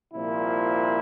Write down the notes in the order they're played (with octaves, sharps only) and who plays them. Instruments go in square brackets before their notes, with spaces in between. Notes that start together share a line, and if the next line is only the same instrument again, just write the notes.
[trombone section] C2 A#2 F3 E4